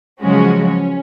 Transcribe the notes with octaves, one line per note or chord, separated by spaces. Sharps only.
C#3 F3 F#3 G#3 C#4 F#4
C#4